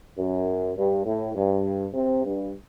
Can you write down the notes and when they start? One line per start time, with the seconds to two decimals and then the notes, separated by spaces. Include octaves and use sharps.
0.17 F#2
0.76 G2
1.05 A2
1.34 G2
1.94 C3
2.24 G2